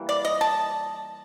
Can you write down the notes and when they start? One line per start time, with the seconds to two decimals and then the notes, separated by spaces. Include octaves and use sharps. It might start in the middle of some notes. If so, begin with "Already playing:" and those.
Already playing: E3 G3 A#3
0.09 D5
0.25 D#5
0.41 A5